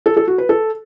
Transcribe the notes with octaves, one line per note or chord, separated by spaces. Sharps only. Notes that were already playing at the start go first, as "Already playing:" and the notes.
A4
A4
F#4
B4
A4